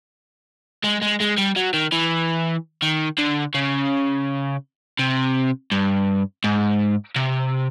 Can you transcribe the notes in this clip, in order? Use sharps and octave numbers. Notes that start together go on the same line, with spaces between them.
G#3
G#3
G#3
G3
F#3
D#3
E3
D#3
D3
C#3
C3
G2
G#2
C3